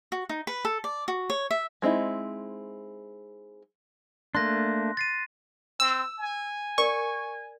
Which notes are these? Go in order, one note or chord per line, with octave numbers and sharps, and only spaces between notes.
F#4
D#4
B4
A4
D5
F#4
C#5
E5
G#3 C4 D#4 E4
A3 A#3 D4 C6 F#6 A#6
A6 C7 D#7
C4 E6
G#5
A#4 D5 C#6